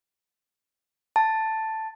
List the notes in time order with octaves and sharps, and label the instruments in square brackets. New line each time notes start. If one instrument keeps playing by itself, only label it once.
[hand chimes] A5